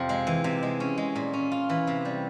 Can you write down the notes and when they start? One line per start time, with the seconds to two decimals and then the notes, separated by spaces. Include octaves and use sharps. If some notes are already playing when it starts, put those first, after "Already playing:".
Already playing: F2 C3 F3
0.09 G#3
0.27 E3
0.44 C3
0.63 G#3
0.80 C#4
0.98 G#3
1.16 A#2
1.33 C#4
1.52 F4
1.69 E3
1.87 C3
2.05 G3